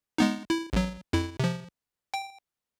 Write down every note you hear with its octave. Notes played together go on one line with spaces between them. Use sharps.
G#3 B3 D#4
E4
A1 F#3
F2 E4
C3 F3
G5